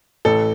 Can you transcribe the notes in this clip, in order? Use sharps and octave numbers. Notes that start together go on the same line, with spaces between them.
A1 A4